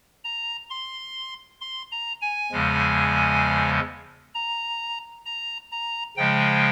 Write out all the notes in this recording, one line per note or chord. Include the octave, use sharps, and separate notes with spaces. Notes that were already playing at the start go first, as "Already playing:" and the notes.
A#5
C6
C6
A#5
G#5
E2 C#3 F3 G#3
A#5
A#5
A#5
C#3 F3 G#3 G5